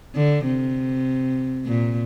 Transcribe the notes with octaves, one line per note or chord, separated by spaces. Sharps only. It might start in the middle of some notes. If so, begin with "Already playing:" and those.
D3
C3
A#2